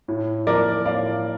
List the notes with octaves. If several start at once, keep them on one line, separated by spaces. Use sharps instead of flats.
A2
F3 A#4 D5
A2 D5 F5